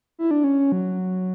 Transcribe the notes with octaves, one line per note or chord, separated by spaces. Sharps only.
E4
D4
C#4
F#3